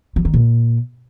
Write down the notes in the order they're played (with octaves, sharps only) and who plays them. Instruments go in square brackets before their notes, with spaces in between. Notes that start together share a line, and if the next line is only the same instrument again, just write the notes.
[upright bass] F3
D#3
A#2